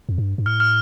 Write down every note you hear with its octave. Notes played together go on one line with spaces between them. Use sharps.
F2
G2
G2
A2 F6
F6